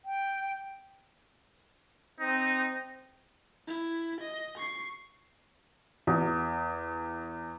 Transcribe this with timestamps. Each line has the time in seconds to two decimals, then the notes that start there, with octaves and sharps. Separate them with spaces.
0.05 G5
2.20 C4 D#4
3.67 E4
4.21 D#5
4.57 C#6 C7
6.07 E2